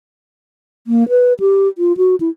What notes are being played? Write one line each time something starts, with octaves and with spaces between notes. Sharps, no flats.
A#3
B4
G4
F4
F#4
E4